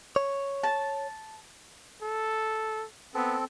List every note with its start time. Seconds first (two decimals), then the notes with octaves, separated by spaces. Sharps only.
0.16 C#5
0.63 A5
2.02 A4
3.15 B3 C4 A4